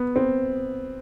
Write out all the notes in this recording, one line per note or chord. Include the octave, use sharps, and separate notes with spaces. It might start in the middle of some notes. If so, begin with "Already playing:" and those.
Already playing: B3
C4